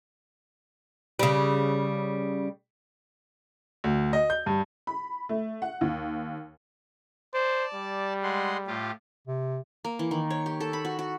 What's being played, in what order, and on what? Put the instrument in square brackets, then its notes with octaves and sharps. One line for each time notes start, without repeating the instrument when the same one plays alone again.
[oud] C#3 G3
[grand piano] D2
D#5
G6
G2
[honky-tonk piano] B5
A3
F#5
D#2
[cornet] C5 [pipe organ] D5 A5
[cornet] G3
[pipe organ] G#3 F#5 C6
A2 F4 G4
[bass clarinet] C3
[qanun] A#3
E3
D#3
C#5
G4
A4
B5
F#4
F#4